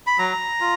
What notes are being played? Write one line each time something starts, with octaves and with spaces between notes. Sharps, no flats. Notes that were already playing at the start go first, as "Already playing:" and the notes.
B5
F#3 A#5
F4